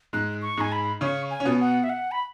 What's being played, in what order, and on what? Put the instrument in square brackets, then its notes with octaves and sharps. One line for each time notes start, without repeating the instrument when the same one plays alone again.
[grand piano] G#2 G#3 [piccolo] F#6
[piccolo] C#6
[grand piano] G#2 G#3 [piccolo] G#5
[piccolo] B5
[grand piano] C#3 C#4 [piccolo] C#6
[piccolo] G#5
[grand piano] C#4
B2 B3
[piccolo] F#5
E5
F#5
B5